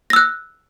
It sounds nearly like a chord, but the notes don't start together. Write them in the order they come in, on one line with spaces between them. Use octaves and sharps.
A#6 E6 F#6